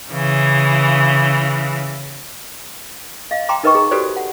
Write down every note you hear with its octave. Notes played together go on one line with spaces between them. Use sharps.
C#3 E3
D#5 F5
G5 A#5 C6 D6
D#4 A#4 B4 D#5 G5 C#6
G#4 A#5
F#4 G4 A4 B4 C5 D5
F#5